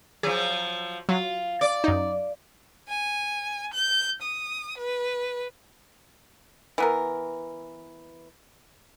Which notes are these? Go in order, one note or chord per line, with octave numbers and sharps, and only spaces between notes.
F3 F#3 G#4
F#3 F4
D5
F#2 D#4
G#5
G6
D#6
B4
E3 B3 A#4